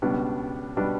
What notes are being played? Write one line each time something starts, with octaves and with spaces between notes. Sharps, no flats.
C#2 B2 G3 B3 D4
B2 G3 B3 D4